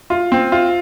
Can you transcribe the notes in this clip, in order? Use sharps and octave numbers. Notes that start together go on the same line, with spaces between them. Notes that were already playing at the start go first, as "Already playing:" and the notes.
F4
C4
F4